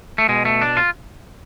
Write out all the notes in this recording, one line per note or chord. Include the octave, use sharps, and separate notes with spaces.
A3
B2 G#3
A3
D4
F4